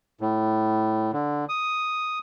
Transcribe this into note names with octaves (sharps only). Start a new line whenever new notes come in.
A2
D3
D#6